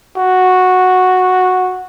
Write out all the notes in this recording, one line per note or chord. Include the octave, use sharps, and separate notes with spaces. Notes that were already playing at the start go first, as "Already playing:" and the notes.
F#4